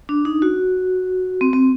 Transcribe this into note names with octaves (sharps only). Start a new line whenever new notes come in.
D4
D#4
F#4
C4
C4